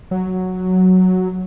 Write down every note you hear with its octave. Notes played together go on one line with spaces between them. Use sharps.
F#3